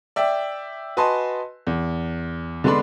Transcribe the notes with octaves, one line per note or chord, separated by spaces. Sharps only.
D5 E5 G5
F#4 B4 D#5 G#5 A5 C6
E2
D3 G#3 B3 D4 B5 C6